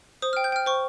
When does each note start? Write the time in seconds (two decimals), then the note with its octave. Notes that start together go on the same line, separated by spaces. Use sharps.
0.22 C5 D#6
0.33 F6
0.37 G5
0.44 G6
0.52 G5 F6
0.66 C5 C#6